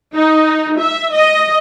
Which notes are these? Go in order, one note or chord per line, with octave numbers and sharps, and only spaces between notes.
D#4
E5
D#5